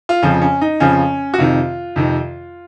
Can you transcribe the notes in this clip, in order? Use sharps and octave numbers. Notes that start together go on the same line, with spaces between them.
F4
F2 C#3 F3 C#4
C#4
D#4
F2 C#3 F3 C#4
F#4
F2 C3 D#3 F4
F2 C3 D#3